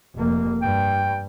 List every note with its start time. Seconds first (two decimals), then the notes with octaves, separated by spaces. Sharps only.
0.15 F1 A#3
0.62 G2 G5